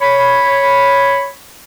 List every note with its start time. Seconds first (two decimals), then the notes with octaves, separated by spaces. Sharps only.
0.02 C#5 B5